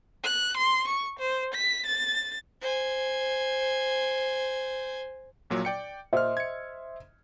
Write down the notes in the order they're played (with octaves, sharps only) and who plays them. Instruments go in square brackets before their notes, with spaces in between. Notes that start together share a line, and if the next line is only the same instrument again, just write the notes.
[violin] F#6
C6
C#6
C5
B6
A6
[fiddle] C5 G#5
[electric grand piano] A#1 A#2 F#3
D5 G5 C#7
[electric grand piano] A#2 F6 [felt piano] C5 D#5 E5
[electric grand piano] G#6 C#7